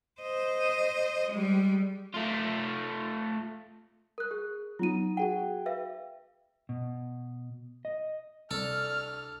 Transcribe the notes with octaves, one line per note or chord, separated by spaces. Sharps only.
C5 D#5
G3 G#3
A3 F4
A#4 F#6
G#4
F#3 B3 D#4 F4 D#7
F#4 G#4 F#5 G5
B4 E5 F5
B2
D#5
C2 D4 A4 F6